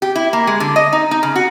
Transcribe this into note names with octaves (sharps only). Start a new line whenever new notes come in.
G4
E4
A#3
G#3
D3
D#5
D#4
D#4
C#3
F#4